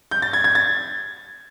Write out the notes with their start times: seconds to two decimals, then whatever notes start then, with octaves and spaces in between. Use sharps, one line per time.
0.11 G6
0.22 A6
0.33 G#6
0.44 G#6
0.55 A6